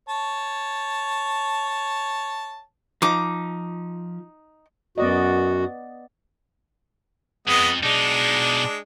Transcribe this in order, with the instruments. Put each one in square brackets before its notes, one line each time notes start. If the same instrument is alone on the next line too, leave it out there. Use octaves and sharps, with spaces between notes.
[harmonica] C#5 A5
[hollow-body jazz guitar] F3 [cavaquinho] D#4 D6
[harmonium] F#2 F#4 [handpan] B3 D5 D#5
[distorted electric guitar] F2 [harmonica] G#3 B3 D#5
[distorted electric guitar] B2 D#4 [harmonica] G#3 D4